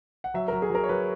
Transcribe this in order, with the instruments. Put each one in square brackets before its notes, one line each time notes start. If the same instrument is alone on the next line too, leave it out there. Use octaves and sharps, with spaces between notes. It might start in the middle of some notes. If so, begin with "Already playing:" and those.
[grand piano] F#5
F#3 E5
F#3 A#4
G#4
F#3 A#4
C#5
F#3 B4